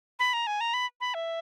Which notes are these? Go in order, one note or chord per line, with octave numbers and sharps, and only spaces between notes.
B5
A#5
G#5
A#5
B5
B5
E5